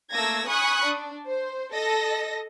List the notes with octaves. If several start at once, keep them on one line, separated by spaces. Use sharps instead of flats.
A3 A#3 E6 G#6 A#6
G#5 B5 C#6 D#6 F#6
D4
C5
A4 D#5 A#6